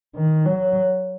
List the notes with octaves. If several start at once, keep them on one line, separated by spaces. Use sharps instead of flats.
D#3
F#3